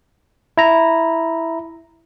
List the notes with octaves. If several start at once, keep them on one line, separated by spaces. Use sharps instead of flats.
E4 A#5